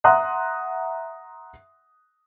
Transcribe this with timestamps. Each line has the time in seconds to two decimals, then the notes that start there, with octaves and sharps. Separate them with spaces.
0.04 E5 F#5 A#5 C6 D#6 F#6